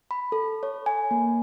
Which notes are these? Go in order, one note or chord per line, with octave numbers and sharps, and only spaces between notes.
B5
A4
C#5
G#5
A#3